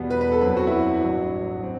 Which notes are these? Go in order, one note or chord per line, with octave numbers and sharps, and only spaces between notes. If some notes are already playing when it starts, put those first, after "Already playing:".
Already playing: E2 B2 G3 B3
B4
B4
A4
F#2 F#3 C4 B4
F#4
E4
F#4
A1 G2 F#3
F#3 C4